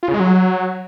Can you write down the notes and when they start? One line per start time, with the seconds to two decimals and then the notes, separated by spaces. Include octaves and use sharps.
0.03 F4
0.08 C#3
0.14 G#3
0.20 F#3